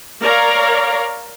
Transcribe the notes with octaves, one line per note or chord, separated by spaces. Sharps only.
A#4 C#5 D5 F5 A#5